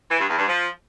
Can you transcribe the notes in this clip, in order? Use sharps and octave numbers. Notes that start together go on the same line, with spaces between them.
E3
G2
E2
G2
F3